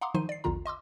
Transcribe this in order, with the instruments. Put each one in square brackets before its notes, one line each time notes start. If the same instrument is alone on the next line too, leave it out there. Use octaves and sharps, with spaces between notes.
[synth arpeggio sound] F5 F#5 A#5 C6 D6 D#6
D#3 F3 D#4 C5 C6 D#7
D5 C7
A#1 E2 D3 F4 A#5
D#5 C6 D6 E6